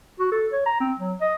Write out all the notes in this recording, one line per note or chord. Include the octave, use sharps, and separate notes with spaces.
F#4
A4
C#5
A#5
C4
F#3
D#5